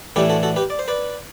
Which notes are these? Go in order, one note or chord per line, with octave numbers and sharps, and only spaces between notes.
A2 E3 A3 D4 G4 B4
F#4 A4
F#4 A4
G4 B4
D5
C5
B4 D5